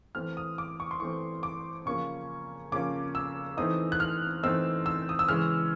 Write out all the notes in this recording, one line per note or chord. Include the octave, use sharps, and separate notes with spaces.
E3 A3 C4 F6
D#6
D6
C#6
C6
E3 A3 C4 C#6
D6
C#3 F3 A#3 C#4 C#6
C#3 F3 A#3 C#4 D6
E6
E3 A3 C4 D#4 D#6
F#6
F6
E3 A3 C4 D#4 E6
E6
D#6
E6
C#3 E3 G#3 C#4 F6